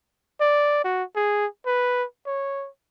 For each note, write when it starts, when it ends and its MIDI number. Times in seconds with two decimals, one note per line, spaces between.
0.41 0.84 74
0.84 1.04 66
1.16 1.46 68
1.66 2.05 71
2.27 2.69 73